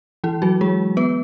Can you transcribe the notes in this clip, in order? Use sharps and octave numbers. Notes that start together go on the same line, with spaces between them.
E3 E4
F#3 F#4
G#3 G#4
B3 B4